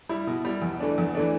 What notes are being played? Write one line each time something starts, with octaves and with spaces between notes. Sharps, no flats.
G3 E4
B2
G3 E4
E2
E3 A3 D4
E2
E3 A3 D4